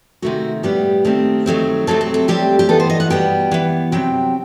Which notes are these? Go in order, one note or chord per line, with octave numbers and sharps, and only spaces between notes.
C3 D#3 A3 F#4
A2 G3 B3 G4
D#3 A3 C4
D#3 F#3 A3 C4
C3 F#3 A3 C4 A4
A4
A4
A2 G3 C4 G4
G4
E3 B3 A4
C5
D#5
F#5
B2 G3 B3 G5
E3 B3
C3 F#3 C4 G5